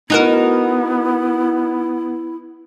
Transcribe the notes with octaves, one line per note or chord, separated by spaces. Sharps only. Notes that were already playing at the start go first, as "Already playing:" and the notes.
B3 D#4 E4 F#4 A#4